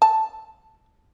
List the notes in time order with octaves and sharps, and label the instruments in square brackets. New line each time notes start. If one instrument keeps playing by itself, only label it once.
[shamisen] A5